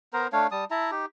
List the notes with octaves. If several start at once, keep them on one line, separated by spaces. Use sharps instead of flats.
B3 A#4 C5 A#5
A3 D4 C#5 F5
G3 A5 D#6
E4 E5 A5 A#5
D#4 G4